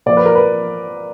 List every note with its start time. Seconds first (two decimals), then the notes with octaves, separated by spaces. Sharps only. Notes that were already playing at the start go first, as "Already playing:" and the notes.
0.06 A#2 F3 A#3 D5
0.17 B4
0.26 A#4
0.35 B4